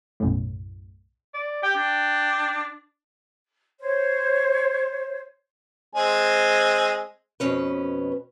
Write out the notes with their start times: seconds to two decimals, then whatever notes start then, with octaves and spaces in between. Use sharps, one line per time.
0.20 B1 F#2 A2
1.33 D5
1.63 G4 G5
1.76 D4
3.78 C5 C#5
5.95 G#3 C4 G#5
7.40 F2 B2 C#4 B4